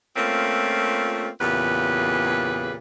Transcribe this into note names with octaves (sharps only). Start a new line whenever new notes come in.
A3 A#3 C4 C#4 F4
E2 A#2 C#3 G4 G#4 B4